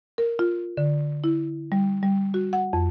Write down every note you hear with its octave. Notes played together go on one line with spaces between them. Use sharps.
A#4
F4
D3
E4
G3
G3
F#4
F#5
F2